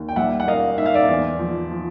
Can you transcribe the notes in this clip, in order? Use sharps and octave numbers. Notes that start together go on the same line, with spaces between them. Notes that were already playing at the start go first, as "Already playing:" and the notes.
Already playing: D#2
G5
G3 E5 F#5
F#5
A#3 D#5 F5
G#2 E5
F5
D5 E5
E2
F3
F3